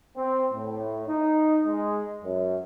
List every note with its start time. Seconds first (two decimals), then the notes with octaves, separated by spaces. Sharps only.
0.17 C4
0.52 A2
1.08 D#4
1.65 G#3
2.24 F#2